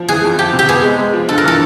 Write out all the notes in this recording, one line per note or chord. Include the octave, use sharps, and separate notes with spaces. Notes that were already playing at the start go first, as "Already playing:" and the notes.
Already playing: F3
E3 G#4
F2
F3 G4
C3
G4
B3 G#4
G#3
G#3
F3
G2 A4
A#4
E3 A4